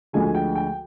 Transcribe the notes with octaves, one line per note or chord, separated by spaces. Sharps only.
D2 D3 F3 G#3 G#5
G5
G5